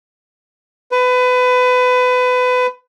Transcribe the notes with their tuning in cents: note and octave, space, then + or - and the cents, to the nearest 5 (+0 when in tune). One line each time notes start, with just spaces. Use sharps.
B4 +25